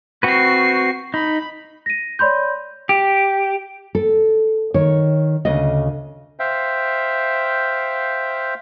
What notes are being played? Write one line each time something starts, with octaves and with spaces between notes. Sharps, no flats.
C4 F#4 B4 C#6 C7
D#4 B5
A#6 D#7
C#5 D5 B5 C6 G6
G4
A4
D#3 C#5
D2 C#3 D#5
C5 E5 F5 G5